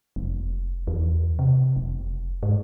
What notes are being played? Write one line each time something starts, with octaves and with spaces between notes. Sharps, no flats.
F1
E2
C3
F1
G#2